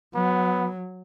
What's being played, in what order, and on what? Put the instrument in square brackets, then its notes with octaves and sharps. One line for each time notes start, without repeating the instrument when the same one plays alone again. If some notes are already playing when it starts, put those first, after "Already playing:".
[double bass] F#3 [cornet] B3